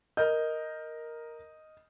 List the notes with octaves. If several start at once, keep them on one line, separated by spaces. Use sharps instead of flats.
A#4 D#5 F6 G6